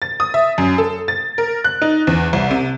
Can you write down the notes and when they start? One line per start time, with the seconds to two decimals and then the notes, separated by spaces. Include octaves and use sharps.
0.02 A6
0.20 D#6
0.34 E5
0.58 F#2
0.78 A4
1.08 A6
1.38 A#4
1.64 F#6
1.82 D#4
2.07 E2
2.33 C2
2.51 C3